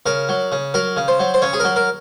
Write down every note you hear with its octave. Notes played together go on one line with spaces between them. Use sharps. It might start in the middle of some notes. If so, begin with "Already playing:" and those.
C#3 A#4
F#3
C#3
F#3 A#4
C#3
C5
F#3
C5
C#3 C#5
G#4
F#3 A#4
A#4